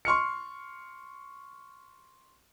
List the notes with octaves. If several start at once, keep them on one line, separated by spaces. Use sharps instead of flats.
C6 C#6 F6 C#7